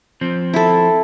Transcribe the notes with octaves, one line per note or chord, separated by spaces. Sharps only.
F3 C4
E4 A4